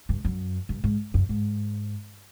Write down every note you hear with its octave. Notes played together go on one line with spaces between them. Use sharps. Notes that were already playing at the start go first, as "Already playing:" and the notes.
G2
F#2
G2
G#2
F#2
G#2